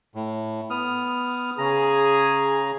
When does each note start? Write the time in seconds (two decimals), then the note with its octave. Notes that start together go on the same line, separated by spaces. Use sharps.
0.15 A2
0.70 B3 D#6 F6
1.58 C#3 G#4 A#5